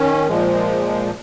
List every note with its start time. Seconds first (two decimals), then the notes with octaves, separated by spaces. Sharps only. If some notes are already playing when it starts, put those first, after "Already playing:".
Already playing: D#3 C#4
0.27 A#2 F3 G#3